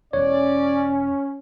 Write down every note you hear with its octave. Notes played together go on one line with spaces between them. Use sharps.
E1 E2 C#4 C#5 D5